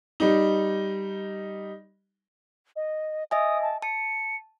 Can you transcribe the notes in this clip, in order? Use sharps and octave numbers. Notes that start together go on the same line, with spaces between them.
G3 D#4
D#5
D#5 E5 G#5 D#6
A5
A5 C#7